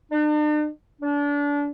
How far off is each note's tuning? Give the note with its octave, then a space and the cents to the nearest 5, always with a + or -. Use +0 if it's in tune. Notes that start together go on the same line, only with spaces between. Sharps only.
D4 +45
D4 -30